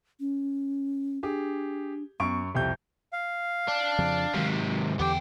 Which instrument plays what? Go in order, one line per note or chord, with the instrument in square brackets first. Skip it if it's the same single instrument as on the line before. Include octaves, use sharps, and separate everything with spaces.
[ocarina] C#4
[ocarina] D4 [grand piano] G4 G#4
[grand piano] F#2 C#6 D7 [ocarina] B3
[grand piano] C2 F2 G6 [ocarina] G4
[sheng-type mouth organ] F5
[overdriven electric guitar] D4
[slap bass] F2 C#3 F3
[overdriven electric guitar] G#2 C3 [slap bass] D#3 F#3
[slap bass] E2 D3 [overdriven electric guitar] B3 G5 [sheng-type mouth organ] G4